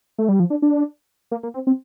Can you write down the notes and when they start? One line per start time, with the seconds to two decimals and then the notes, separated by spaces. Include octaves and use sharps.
0.18 A3
0.29 G3
0.40 F3
0.50 D4
0.62 D4
1.32 A#3
1.43 A#3
1.54 C4
1.67 C4